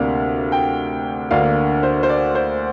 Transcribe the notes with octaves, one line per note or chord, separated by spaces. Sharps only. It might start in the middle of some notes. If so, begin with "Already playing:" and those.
Already playing: D2 C3 A#3 D4 F5
G5
D2 D3 A#3 D4 F5
C5
C5
D5
C5